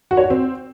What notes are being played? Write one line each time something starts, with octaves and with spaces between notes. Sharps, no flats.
F#4
C#5
F#4
C4